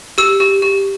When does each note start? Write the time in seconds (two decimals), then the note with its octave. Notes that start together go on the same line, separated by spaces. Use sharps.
0.18 G4 E6
0.40 G4
0.62 G4